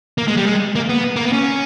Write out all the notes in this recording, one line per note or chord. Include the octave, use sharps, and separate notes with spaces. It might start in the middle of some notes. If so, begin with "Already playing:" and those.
A#3
G#3
G3
G#3
A#3
B3
A#3
B3
C#4